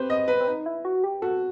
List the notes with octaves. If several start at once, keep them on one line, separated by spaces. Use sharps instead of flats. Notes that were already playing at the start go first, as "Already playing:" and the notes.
Already playing: C4 G4 B4 C5
D#5
B4
C4
D#4
E4
F#4
G4
F#4 A4